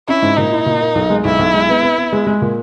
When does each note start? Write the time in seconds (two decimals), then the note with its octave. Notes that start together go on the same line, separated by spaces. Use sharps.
0.08 C#4 E4
0.22 G#2
0.37 A#2 D#4
0.52 E4
0.66 A#2
0.81 A#3
0.95 B1
1.10 G#3
1.24 B1 E4
1.39 B1
1.53 G#3
1.69 B3
1.83 B3
1.98 B3
2.12 G#3
2.27 G#3
2.42 A#2